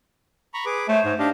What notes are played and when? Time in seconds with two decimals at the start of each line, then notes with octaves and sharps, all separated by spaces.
0.54 A#5 B5 C#6
0.66 G#4 B4 D6
0.88 A3 C5 C#5
1.05 G#2
1.19 D4 G4 D#5 F5